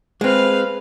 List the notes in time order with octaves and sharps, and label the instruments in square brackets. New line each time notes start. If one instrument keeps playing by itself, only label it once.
[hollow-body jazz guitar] G#3 C4 [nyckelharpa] B4 F5